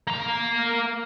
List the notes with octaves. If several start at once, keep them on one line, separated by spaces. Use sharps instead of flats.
A#3 A#5